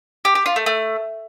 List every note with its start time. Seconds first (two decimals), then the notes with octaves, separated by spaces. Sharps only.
0.25 G4
0.35 G4
0.46 F4
0.56 A3
0.66 A3